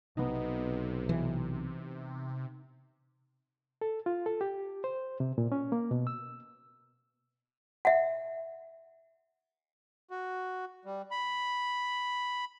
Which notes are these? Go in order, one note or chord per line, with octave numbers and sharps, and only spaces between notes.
B1 C3 B3 D#4
E3
A4
F4
A4
G4
C5
C3
A#2
C#4
A#3
B2
E6
E5 F#5
F#4
G3
B5